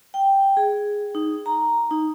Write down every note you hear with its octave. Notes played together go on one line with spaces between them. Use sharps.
G5
G#4
D#4
A#5
D#4